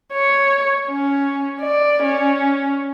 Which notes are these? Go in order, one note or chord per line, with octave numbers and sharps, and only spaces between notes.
C#5
C#4
D5
C#4